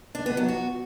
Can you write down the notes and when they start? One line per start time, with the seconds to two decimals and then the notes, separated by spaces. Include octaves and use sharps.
0.15 D4
0.26 B3
0.37 F#3
0.48 F#4